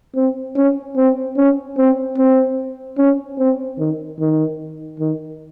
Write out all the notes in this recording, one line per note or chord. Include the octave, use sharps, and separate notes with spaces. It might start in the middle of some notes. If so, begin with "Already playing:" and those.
C4
C#4
C4
C#4
C4
C4
C#4
C4
D#3
D#3
D#3